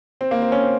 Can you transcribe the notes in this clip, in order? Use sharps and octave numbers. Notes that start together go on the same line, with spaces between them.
C4
A#3
C4
C#4
C4